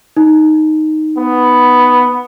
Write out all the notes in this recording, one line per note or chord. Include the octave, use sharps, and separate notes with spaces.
D#4
B3